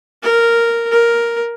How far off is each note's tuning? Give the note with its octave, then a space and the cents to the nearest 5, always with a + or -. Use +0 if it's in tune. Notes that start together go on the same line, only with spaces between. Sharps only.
A#4 -5
A#4 +5